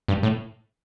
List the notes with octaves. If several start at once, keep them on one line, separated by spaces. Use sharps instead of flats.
G2
A2